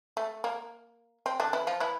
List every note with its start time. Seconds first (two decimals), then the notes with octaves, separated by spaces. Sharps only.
0.17 A3
0.44 A#3
1.26 C4
1.40 D3 D4
1.53 E3 E4
1.67 F3 F4
1.80 E3 E4